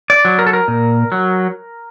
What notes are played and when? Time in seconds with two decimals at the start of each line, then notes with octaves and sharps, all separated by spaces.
0.10 D5
0.25 F#3
0.39 A#4
0.47 A4
0.53 A#4
0.68 A#2
1.12 F#3